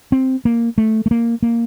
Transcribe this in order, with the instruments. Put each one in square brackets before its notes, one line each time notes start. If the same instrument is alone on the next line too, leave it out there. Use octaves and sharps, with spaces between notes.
[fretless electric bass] C4
A#3
A3
A3
A#3
A#3